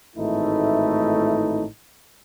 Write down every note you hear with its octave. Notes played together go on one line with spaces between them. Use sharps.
G#1 A2 E3 A3 D#4 E4